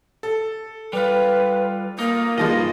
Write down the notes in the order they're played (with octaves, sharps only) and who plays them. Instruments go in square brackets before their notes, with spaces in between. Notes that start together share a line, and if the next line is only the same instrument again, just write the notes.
[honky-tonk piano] A4
[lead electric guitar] G3 F4 [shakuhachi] B4
[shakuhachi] A#3 [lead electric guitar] D#4 F4
[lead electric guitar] G2 D#5 [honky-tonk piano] D#3 F3 G#3